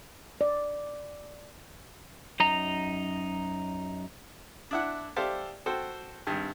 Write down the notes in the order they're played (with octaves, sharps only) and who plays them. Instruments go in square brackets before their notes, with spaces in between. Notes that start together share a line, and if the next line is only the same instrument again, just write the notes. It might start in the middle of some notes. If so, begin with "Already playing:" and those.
[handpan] D5
[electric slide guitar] F#2 D#4 A#5
[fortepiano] D4 E4 F#5
G4 A4 C5 D5 E5 F5
F#4 A4 C5 G5
G#1 G2